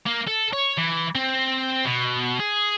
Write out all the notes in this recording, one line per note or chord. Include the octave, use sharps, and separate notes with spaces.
A#3
A4
C#5
E3
C4
B2
G#4